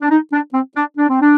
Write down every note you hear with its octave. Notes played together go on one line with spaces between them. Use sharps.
D4
D#4
D4
C4
D4
D4
C4
D4